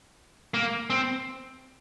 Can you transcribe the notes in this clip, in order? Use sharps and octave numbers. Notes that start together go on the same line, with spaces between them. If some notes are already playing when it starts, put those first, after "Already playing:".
A#3
C4